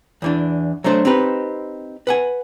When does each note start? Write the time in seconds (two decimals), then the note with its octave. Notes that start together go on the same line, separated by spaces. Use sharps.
0.22 E2 E3 D4
0.84 F#3 A3 D4 C5
1.05 C4 D#4 G4 B4
2.07 B4 F#5 G#5